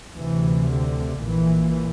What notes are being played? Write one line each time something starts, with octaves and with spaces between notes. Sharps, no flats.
D2 C3 E3
D3
A#1 A#2 E3